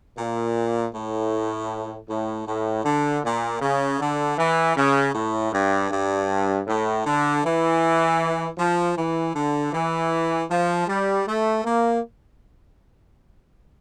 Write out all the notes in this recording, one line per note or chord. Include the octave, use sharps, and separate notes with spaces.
A#2
A2
A2
A2
D3
A#2
C#3
D3
E3
C#3
A2
G2
G2
A2
D3
E3
F3
E3
D3
E3
F3
G3
A3
A#3